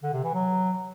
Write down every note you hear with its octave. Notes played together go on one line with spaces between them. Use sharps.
D3
C3
E3
F#3